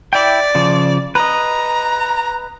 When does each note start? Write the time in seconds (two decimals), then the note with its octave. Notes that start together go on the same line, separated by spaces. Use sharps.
0.13 E4 D5 G5
0.55 C#3 F3
1.15 B4 D#5 A#5